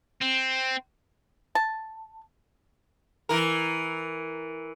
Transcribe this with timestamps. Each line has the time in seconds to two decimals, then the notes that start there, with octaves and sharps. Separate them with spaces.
0.21 C4
1.55 A5
3.29 E3 A#4